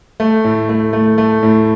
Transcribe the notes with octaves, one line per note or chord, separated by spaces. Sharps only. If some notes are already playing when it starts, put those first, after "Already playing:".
A3
A2
A3
A3
A3
A2